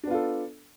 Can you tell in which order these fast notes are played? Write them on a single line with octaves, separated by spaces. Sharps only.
D4 B3 F4 A4